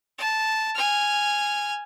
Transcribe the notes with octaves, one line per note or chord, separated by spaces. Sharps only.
A5
G#5 F6